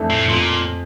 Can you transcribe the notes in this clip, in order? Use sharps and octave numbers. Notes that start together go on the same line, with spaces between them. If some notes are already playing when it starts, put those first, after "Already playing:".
Already playing: F2 E3 A3 D4 A4
A2
F2 A#2